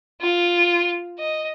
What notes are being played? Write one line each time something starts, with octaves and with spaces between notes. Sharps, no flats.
F4
D#5